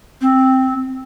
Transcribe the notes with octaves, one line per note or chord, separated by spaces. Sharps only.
C4